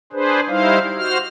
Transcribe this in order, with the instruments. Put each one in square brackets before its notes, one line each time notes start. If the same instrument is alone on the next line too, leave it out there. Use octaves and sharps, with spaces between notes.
[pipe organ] D4 G#4 B4 C5
G3 D#4 E4 C5 F5
F#4 C5 F6